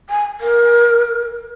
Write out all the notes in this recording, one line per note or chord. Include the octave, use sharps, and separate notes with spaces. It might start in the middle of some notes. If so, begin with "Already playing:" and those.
G#5
A#4